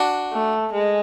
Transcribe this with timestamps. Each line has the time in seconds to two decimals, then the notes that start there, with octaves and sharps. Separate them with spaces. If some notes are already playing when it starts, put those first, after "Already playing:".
Already playing: D4 F#4
0.32 A3
0.72 G#3